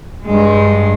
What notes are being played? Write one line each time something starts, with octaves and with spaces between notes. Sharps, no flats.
G2 G#3